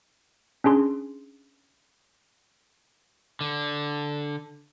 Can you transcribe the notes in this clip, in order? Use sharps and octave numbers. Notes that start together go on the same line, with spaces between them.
C#4 D4 G#4 C6
D3